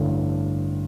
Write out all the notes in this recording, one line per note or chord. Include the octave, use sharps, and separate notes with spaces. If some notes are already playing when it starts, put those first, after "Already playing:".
Already playing: A1 G2 D3